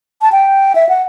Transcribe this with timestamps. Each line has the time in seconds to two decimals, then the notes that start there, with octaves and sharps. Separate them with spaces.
0.22 A5
0.32 G5
0.75 E5
0.89 F#5